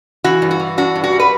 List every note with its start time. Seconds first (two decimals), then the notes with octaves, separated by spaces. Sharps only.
0.24 E3 F#4
0.42 G2
0.51 F#4
0.60 E3
0.78 D4 F#4
0.95 G2
1.04 F#4
1.13 G3
1.20 B4